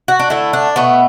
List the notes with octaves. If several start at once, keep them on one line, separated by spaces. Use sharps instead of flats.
F#4
D4
D3 A3 E4
D4
B2 A3 B3